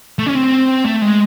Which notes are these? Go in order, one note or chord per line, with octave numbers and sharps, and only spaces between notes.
A3
C#4
C4
A3
G#3